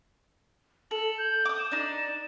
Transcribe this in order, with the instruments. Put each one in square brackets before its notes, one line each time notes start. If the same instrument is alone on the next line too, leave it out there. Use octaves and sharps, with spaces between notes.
[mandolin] A4 [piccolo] F#7
[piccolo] G6
[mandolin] D6 D#6
[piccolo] E7
[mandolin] D4 D#4